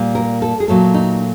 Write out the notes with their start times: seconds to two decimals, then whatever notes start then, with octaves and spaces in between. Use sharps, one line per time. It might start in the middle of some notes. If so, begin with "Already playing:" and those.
Already playing: A#2 G3
0.15 A#4
0.42 A4
0.60 G#4
0.68 A#2 F#3 A3 A4
0.94 D#4